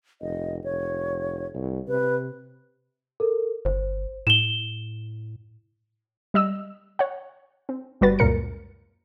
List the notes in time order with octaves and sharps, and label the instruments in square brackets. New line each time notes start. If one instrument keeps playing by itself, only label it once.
[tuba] F1 [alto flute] D#5
[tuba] F1 [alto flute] C#5
[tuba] C2
[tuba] C3 [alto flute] B4
[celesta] A4 A#4
[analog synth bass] G1 [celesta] C5
[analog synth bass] A2 [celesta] E7 G7
[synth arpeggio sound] G3 D#5 E6
C#5 F#5
C4
G1 G3 F#4 B4 A6
C#2 F#2 A#2 A#4 C#7